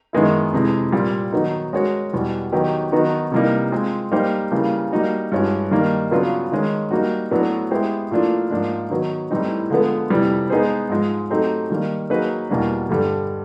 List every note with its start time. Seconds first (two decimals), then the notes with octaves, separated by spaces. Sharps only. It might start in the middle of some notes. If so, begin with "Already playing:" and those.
0.13 F#2 D#3 G#3 B3 E4
0.53 F2 C3 E3 G#3
0.92 A#2 G3 C4
1.32 D#3 F#3 B3 D#4
1.73 G#3 C#4 F#4 A#4 C#5
2.13 E2 B2 G3
2.52 D#3 F#3 B3 D#4 G4
2.92 D#3 F#3 B3 D#4 F#4
3.32 C3 E3 G3 A#3 D#4
3.72 G#3 C4 F4
4.12 G3 A#3 D#4 G4 C5
4.52 C#3 E3 G3 A#3
4.92 G3 A#3 D#4 F#4
5.32 G2 E3 G#3 C#4 F#4
5.71 D#3 G3 A#3 D#4
6.11 C#3 F#3 B3 D4 F4
6.52 D#3 G#3 C#4
6.91 G3 A#3 D#4 F#4
7.31 A2 F#3 B3 D4 F#4
7.71 G#3 B3 E4 G4 C5
8.11 A2 F3 A#3 D4 F4
8.51 G#2 F3 A#3 D4
8.90 D#3 F#3 B3
9.31 A2 E3 G3 C4 D#4
9.70 D3 F3 G#3 B3
10.10 F2 C3 E3 G3
10.50 G#3 B3 D#4 G#4 C5
10.90 G#2 F3 G#3
11.30 F#3 A3 C4 D#4 G4
11.70 D#3 G3 A#3
12.10 F#3 A#3 D#4 G#4 B4
12.50 E2 B2 G3 A#3 D4
12.89 G2 D3 G3